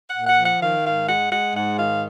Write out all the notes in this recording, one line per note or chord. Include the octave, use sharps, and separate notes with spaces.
F#5
A#2
F#5
F3
F#5
D#3 F5
G#2 F5
G#3 F#5
G#3 F#5
G#2 F#5
D#3 F5